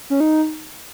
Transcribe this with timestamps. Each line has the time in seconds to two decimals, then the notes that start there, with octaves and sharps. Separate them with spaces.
0.10 C#4
0.20 D#4